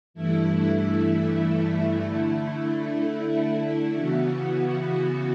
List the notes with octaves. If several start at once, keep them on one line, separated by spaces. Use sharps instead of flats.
G2 E3 A3 E4
D3 A3 E4
C#3 E3 B3 F#4